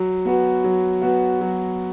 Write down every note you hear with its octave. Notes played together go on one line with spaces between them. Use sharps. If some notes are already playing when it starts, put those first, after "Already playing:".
Already playing: F#3
B3 F#4
F#3
B3 F#4
F#3